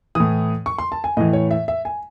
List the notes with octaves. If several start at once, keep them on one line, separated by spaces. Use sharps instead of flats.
A2 E3 D#6
C#6
C6
A5
G#5
A2 E3 D#5
C#5
E5
E5
G#5